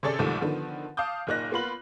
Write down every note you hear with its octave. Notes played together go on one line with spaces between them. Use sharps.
C3 C#4 G#4 A4 D5 A6
C2 G#2 C3 D#3 F3 A3
D3 D#3 F3 B3
F5 A5 D6 D#6 G6
F#1 A#2 A#3 D#4 F#6 A#6
A#3 B3 F4 B5 F#7